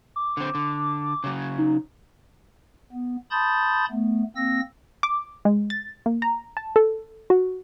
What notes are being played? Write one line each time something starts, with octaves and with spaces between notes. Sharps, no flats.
D6
D3 C4
D3
C#3 F#3
D#4
B3
A5 B5 C6 D#6 G6 A6
A3 B3
A#3 C4 E6 A#6
D6
G#3
A6
A#3
A#5
A5
A4
F#4